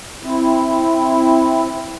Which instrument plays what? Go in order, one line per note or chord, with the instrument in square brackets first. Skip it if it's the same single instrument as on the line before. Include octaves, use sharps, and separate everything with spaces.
[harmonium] C4 E4